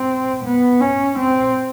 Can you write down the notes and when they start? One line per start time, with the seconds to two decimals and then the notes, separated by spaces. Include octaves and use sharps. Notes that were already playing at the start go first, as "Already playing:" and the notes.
Already playing: C4
0.45 B3
0.81 C#4
1.19 C4